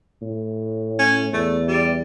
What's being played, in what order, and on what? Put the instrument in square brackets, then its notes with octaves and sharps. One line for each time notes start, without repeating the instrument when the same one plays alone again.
[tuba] A2
[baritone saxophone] C#4
[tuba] E2 [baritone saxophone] A3
[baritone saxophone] G3